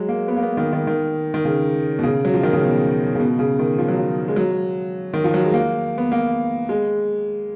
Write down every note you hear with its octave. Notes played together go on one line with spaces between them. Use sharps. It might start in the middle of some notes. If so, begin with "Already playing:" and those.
Already playing: F#3 G#3
A#3
B3
A#3
B3
D#3
D#3
D#3
D#3
C#3
B2
C#3
F#3
F3
D#3
C#3
B2
C#3
B2
C#3
D#3
F3
F#3
F3
G#3
F#3
D#3
F3
F#3
G#3
A#3
B3
A#3
G#3